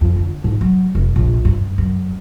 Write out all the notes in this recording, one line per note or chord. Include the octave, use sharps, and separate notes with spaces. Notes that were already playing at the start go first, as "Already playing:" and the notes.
F2
D3
G#2
F#3
F1
A#1
G2
F#2